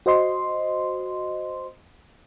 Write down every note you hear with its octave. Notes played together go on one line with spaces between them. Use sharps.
F#4 C5 D#5 C6